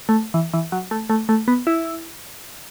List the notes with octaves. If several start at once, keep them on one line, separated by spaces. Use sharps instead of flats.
A3
E3
E3
F#3
A3
A3
A3
B3
E4